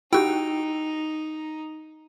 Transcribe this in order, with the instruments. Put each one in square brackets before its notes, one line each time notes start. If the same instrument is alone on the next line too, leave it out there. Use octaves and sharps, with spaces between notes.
[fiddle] D#4 [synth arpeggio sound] E4 F#4 G4 [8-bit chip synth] G5